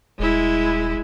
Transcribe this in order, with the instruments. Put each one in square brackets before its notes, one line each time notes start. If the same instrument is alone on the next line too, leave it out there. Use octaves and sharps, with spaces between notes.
[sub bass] D#1 [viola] G#3 E4